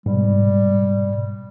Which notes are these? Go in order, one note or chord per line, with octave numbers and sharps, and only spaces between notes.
G#2 B2 G3